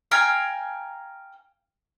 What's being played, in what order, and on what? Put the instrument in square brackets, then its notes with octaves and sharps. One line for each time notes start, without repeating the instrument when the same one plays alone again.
[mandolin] F5 G5 G#5 A#5